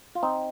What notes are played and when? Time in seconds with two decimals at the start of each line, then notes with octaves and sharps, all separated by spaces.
0.15 F4
0.23 C4 D#4